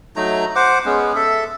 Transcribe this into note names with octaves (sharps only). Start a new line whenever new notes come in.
F#3 A3 D#4 A#5
C5 F#5 D6
G#3 B3 C#4
A4 E5